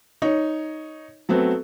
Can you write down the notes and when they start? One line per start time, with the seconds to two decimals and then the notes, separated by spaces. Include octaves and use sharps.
0.22 D#4 C#5
1.29 F#3 A3 B3 C4